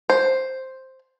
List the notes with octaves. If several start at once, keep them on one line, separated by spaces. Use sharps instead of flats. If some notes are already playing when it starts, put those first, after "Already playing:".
C5